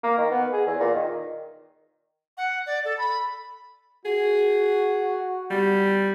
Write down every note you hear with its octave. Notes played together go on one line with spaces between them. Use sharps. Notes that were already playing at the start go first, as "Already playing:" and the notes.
A#3
D#3
B3
G#4
E2
A#2
D#3
F#5
D5
A4
B5
F#4 G#4
G3